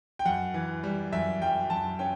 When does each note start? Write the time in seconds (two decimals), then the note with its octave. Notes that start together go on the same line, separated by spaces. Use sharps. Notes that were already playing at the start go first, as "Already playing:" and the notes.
0.19 G5
0.25 F#2 F#5
0.54 E3
0.83 G3
1.12 F#2 E5
1.42 F#2 G5
1.70 F#2 A5
1.99 C#4 G5